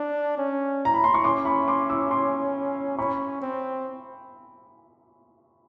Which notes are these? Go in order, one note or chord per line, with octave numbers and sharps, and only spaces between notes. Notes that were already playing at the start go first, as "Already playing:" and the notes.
Already playing: D4
C#4
A#5
B5
C6
C#6
C#4 C6 D6
B5 C#6
C6 D6
D6 E6
C6 D6
C#4 B5 C#6
C4